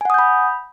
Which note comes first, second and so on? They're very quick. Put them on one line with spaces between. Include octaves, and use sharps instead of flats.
G#5 F#5 D#6 G6 B5